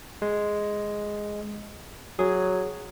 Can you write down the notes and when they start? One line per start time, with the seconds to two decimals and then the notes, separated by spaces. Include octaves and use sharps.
0.22 G#3
2.19 F#3 G#4